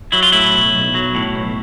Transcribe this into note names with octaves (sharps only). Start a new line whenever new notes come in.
F#3 E4
F4
A2 E4
B1
B1
F#3
A2
B1